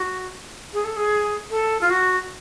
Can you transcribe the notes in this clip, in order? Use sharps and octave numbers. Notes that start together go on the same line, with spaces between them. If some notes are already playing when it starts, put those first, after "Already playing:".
Already playing: F#4
G#4
A4
G#4
A4
F4
F#4